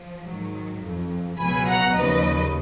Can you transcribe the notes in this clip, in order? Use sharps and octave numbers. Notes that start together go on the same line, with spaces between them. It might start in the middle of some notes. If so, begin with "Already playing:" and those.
Already playing: F3
G#2 D#3 F#3
F2 F3
C#2 B2 F#3 G#5 B5
F#5 A#5
D#2 C#3 F3 B4 D#5